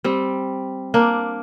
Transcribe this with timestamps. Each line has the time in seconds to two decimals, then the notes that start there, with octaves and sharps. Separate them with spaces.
0.04 G3 C4
0.94 A#3 D4